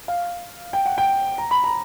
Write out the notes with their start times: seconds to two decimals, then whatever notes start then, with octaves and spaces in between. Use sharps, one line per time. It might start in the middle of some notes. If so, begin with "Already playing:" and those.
0.08 F5
0.73 G5
0.86 F#5
0.98 G5
1.38 A#5
1.51 B5
1.64 A#5